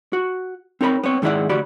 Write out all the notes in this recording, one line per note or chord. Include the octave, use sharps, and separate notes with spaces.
F#4
C4 D#4 A#4 C#5 A#5 B5
B3 C4 C#5
G#2 D#3 G#3 E4 D5 F#5
D2 F#4 G4 D5 B5